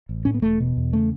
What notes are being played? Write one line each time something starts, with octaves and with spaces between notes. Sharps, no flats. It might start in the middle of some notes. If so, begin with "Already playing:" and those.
A1
A2 C#4
B3
E1 A3
B2
E2
C#3 A3